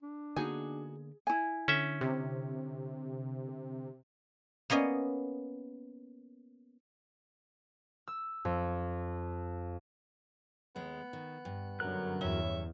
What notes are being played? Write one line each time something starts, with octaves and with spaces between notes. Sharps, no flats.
D4
D3 A#3 B3 D#4 F#4 G#4 G#5
E4 G#5
D3 C#4 E5
C3
A#3 B3 C#4 D#5
E6
F2
D#2 G#3 B3
D#3
G2
F#2 D3 F#3 A#4 F#6
E2 G2 C#3 C#5 E5